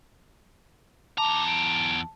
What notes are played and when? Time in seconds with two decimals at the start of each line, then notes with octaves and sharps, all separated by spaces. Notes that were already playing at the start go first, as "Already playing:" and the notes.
1.18 E2 A5 A#5 D6
1.47 D7